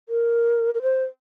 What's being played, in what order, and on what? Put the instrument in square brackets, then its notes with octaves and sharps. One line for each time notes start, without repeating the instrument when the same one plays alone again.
[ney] A#4
A#4
C5